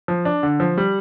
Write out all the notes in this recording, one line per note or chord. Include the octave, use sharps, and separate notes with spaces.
F3
D4
D3
F3
G3